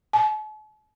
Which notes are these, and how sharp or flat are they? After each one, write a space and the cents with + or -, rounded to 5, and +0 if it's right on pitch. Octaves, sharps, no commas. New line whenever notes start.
A5 -45